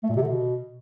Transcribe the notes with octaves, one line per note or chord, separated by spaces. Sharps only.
A3
A#2
C3
D3
B2